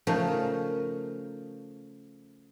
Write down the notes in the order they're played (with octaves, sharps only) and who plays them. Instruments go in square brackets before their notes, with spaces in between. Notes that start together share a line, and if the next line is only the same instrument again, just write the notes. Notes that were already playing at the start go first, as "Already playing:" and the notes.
[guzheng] C#3 F3 A3 C#4 D#4 A#4